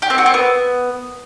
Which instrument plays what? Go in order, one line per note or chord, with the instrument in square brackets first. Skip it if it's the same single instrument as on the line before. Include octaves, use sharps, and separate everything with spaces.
[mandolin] G4
C4
F#4
C4
B3